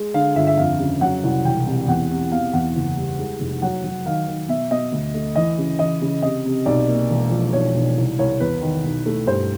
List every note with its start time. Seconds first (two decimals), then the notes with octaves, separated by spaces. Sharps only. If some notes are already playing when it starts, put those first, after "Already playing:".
Already playing: G#3
0.14 D3 F5
0.35 G1 E5
0.47 E5
0.57 F2 F5
0.80 C#3
1.01 F#3 F#5
1.23 C2
1.44 E1 G5
1.66 C3
1.87 E2 F#5
2.10 C3
2.31 B2 F5
2.53 E2 F#5
2.76 F#1
2.97 G3
3.18 G#3
3.40 F1
3.62 F#3 F#5
3.84 F#3
4.05 D#3 F5
4.27 D#3
4.48 B2 E5
4.71 B2 D#5
4.92 D2
5.14 A3
5.35 E3 D#5
5.58 C#3
5.79 E3 D#5
6.02 C#3
6.22 C3 D#5
6.45 C3
6.66 B1 D5
6.88 A#3
7.10 E1
7.31 F3
7.53 B1 C#5
7.75 B1
7.97 C2
8.19 C2 C#5
8.40 E2 B4
8.62 D#3
8.84 B1
9.06 A3
9.27 G2 C5